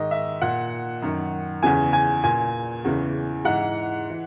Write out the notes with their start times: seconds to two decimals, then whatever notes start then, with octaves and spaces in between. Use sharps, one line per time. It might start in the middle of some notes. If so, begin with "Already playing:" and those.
Already playing: G#2 D#3 D#5
0.11 E5
0.41 A#2 F#5
1.02 F#2 D#3
1.63 E2 C#3 E3 G#5
1.93 G#5
2.23 A#2 G#5
2.84 E2 C#3 E3
3.45 G#2 E3 F#5
4.10 E3